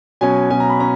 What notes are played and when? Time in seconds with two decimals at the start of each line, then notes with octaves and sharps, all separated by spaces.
0.21 B2 F#3 C#4 G#5
0.50 B2 F#3 C#4 G#5
0.60 A#5
0.70 B5
0.80 C#4 A#5